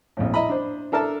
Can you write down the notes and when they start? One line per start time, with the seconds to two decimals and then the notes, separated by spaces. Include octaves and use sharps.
0.17 A#1 F2 A2
0.34 E4 D#5 E5 A#5 B5
0.49 D4 C5
0.92 D4 A4 A#4 E5 A5